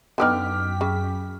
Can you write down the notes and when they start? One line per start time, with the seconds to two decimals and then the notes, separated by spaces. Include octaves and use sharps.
0.18 F#2 D3 B3 D#4 G5 D6 F6 B6
0.81 C#3